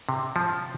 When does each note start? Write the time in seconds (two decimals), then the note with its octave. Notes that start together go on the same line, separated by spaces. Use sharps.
0.09 C3
0.36 F3